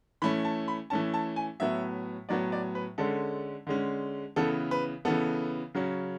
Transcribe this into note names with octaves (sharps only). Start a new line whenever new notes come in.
E3 A3 C#4 B5
A5
B5
E3 A3 C#4 A5
A5
G#5
A2 F#3 B3 E5
A2 F#3 B3 D5
D5
B4
D3 G#3 C#4 A4
D3 G#3 C#4
C#3 E3 B3 A4
B4
C#3 E3 B3 A4
C#3 F#3 C#4